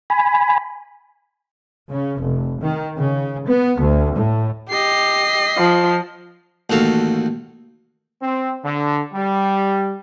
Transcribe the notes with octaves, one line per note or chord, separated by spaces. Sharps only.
G#5 B5
C#3
F1
D#3
C#3
B3
D2
A2
G4 D#5 C7
F3
A1 D#2 F#4 A4 F5
C4
D3
G3